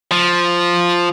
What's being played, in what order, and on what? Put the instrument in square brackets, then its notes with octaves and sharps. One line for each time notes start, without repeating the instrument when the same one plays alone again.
[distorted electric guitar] F3